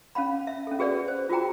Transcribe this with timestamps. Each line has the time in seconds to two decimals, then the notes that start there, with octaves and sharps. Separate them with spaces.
0.15 C#4 F5 F#5 B5
0.47 E5
0.67 C#4 A4
0.79 F#4 G#4 B4 D5 F#5
1.08 C5
1.29 F4 F#4 G#4 G5 A#5